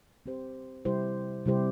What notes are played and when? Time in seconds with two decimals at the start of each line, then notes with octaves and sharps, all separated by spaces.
0.26 C4 G4 C5
0.85 C3 G3 E4 G4 C5
1.46 C3 G3 E4 G4 C5